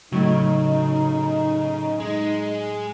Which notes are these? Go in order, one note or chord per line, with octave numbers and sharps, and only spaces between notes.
A2 C#3 F#3 D#4
G#3